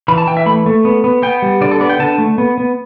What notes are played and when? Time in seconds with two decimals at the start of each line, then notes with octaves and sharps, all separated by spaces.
0.08 E3 B5
0.18 A5
0.27 E3 G5
0.37 E5
0.46 A3 B5
0.66 A3
0.85 B3
1.04 B3
1.22 B3 G5
1.42 G3
1.61 D3 D5
1.71 A4
1.80 B3 D5
1.90 G5
2.00 D3 A5
2.18 A3
2.38 B3
2.58 B3